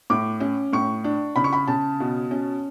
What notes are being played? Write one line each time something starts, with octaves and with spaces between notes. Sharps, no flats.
A2 D6
C#4
A2 C#6
D4
C#3 B5
C#6
B5
C#3 A5
B2
C#4